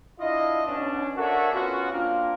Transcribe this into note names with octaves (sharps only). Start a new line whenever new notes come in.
D4 E4 F4 D#5
B1 B2 C#4 D4
D4 F#4 A4 A#4 C#5 E5
B3 C#4 F4 F#4
A#3 C4 D4 F4 A#4